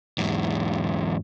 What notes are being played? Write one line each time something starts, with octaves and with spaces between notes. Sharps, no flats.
E2 G#2